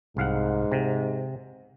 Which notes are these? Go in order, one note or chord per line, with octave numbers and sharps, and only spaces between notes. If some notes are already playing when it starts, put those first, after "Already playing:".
C2 G#2 F5 F#5
C3